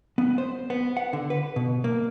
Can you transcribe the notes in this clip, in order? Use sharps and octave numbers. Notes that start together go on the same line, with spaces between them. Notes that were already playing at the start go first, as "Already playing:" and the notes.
B3
C5
B3
F#5
D3
B4
B2
A#3